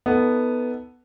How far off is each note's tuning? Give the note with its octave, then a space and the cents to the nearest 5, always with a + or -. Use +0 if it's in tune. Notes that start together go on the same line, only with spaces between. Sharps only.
B3 +0 D#4 +25 A4 +5